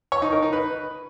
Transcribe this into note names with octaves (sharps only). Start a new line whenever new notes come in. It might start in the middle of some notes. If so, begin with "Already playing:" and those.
C#5
D#4
A#4
D#4
B4